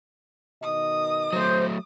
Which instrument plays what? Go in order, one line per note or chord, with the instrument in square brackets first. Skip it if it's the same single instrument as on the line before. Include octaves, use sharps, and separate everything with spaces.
[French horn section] B2 D#3 D#5 [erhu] D#6
[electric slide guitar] F#3 A3 [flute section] C5